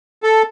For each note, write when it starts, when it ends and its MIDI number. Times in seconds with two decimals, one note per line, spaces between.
0.23 0.42 69